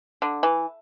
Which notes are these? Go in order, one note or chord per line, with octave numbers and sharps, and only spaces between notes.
D3
E3